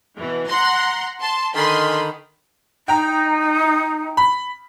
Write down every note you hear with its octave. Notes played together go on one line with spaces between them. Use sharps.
B2 E3
F#5 A#5 C6
A5 C6
D3 D#3 G#5 B5 C6
D#4 G5 A#5
B5